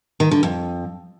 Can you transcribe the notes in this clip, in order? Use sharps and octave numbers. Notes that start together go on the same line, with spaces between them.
D#3
D3
F2